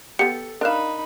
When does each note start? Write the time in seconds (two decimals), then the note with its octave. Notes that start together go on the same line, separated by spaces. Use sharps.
0.19 B3 G4 A4 C#7
0.61 D4 D#4 A#4 F5 B5 F#6 E7